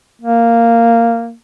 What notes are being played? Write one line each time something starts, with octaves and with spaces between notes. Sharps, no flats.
A#3